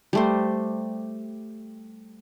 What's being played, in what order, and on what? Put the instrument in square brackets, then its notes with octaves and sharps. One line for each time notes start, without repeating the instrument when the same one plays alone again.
[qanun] G3 A3 C5